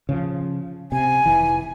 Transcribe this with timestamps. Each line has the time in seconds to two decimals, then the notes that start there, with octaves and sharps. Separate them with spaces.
0.09 C#3 E3 F3
0.92 C3 G#5
1.26 F1 E3